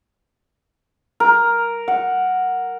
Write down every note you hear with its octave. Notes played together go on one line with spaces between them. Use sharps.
A#4
F#5